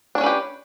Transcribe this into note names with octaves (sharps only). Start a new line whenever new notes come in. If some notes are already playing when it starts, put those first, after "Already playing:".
C#4 D4 G4 B4 C#5